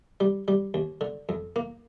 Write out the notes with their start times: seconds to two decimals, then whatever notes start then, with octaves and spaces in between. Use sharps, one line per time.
0.20 G3
0.48 G3
0.74 D#2
1.01 D3
1.29 F2
1.56 A#3